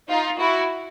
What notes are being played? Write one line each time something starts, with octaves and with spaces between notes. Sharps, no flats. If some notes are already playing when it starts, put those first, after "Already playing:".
D#4 F4
E4 F#4